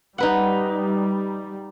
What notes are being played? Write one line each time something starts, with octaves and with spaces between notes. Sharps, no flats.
G3 D#4 B4 F#5